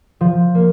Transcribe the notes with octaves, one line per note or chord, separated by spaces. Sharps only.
F3
A#3